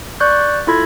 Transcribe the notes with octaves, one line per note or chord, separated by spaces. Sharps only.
D5 C#6 F#6 G6
E4 F4 A4 B5 G#6